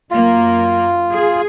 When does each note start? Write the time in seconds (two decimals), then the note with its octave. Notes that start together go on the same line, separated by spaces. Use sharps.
0.11 F#2 A#3 F4
1.14 G#4